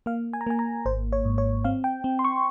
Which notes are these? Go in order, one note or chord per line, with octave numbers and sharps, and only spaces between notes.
A#3 F5
G#5
A#5
A#3 G#5
A#5
G#1 C5
C#5
G#2
C#5
C4 F5
G5
C4
C6
C#6